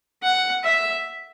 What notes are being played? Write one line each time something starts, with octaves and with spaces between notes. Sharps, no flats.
F#5
E5